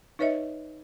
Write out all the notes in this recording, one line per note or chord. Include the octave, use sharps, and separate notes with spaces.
D#4 B4 C#5 D#5 E5